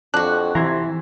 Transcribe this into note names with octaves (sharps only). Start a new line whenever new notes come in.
F2 D4 F#4 F#6
C3 E3 A#5 C6 G#6